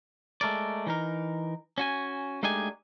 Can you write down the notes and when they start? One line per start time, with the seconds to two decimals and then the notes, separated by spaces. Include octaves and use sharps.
0.41 G#3 A3 A#4 D5
0.87 E3 D#4 A#4
1.78 C#4 F#4 G#5
2.43 G#3 A3 D4 D#4 G4 G#5